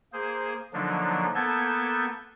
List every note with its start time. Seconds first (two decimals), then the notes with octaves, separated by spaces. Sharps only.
0.13 A#3 G#4 C5
0.74 D3 F3 F#3 A#3 D4 D#4
1.35 A#3 B3 A4 A5 G6 G#6